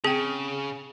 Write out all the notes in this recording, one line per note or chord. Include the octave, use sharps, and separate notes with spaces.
C#3 C4 G#4 G5